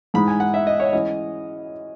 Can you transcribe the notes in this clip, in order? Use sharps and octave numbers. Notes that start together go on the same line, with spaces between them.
G#2 E3 G#3 D#4 B5
G#5
F#5
E5
D#5
C#5
E3 G#3 C#4 D#5